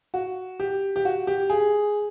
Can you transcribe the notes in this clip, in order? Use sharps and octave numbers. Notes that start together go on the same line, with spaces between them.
F#4
G4
G4
F#4
G4
G#4